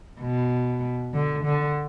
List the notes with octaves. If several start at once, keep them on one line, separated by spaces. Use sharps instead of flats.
B2
D3
D3